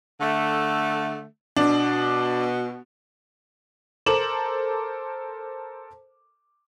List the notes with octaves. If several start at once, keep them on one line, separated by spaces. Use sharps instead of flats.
D3 A3
B2 D4
A4 A#4 C5 D6 E7 F#7